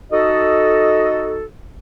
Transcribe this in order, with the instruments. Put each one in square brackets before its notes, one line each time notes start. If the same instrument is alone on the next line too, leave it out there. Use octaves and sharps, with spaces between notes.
[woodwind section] D#4 F#4 A4 [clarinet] D#5